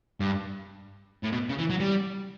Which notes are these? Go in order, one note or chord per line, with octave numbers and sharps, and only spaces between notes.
G2
A2
B2
C#3
E3
F#3
G3